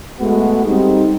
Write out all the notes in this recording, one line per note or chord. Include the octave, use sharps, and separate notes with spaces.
G#3 A3 B3 F#4
G3 C4 D#4